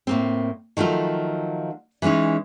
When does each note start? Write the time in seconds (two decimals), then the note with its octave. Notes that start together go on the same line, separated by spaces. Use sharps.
0.07 A2 A#3 C4
0.77 D#3 F3 F#3 A3 F4
2.02 E3 G#3 C4 C#4 D#4